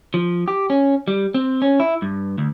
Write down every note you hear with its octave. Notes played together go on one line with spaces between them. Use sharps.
F3
G4
C#4
G3
C4
C#4
E4
G2
D2